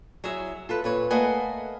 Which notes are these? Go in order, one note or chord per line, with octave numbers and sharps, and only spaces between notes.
F#3 E4 G#4 E5
F4 A4 B4
A#2 B4 C#5
A3 A#3 B4 D#5 F#5 G#5